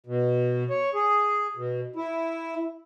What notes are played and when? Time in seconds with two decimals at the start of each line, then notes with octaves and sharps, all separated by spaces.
0.06 B2
0.70 C#5
0.94 G#4
1.56 B2
1.96 E4